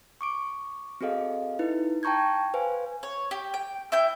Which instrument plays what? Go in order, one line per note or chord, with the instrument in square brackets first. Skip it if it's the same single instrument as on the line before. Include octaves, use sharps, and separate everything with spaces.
[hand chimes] C#6 D6 D7
C4 F#4 G#4 A4 D#5 F5
D#4 E4 B4
G5 A5 A#5 C#6 G6 G#6
B4 C5 F5 G#5
[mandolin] C#5
G4
G5
E4 G5 G6